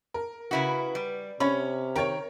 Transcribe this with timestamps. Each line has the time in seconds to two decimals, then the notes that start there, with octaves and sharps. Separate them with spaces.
0.14 A#4
0.51 C#3 E4 F#4 B4
0.95 G3
1.40 C3 C#4 C#5 B5
1.96 D#3 A#4 C#5 G5